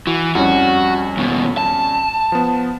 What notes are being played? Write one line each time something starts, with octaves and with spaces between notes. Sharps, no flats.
E3 F#4
F2 G3 C#4 F#4
D#2 B2
A5
F3 B3